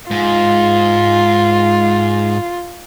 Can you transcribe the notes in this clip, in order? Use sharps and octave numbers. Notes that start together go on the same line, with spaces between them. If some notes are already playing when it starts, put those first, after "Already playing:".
G#2 F4